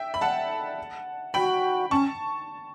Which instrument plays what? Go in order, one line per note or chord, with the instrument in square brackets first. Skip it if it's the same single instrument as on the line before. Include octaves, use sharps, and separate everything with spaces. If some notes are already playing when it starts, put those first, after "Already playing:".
Already playing: [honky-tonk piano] E5 G5
B5
F#5 A5
[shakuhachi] F#4 [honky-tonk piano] G5 B5
[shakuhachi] C#4 [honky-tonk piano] A5 C#6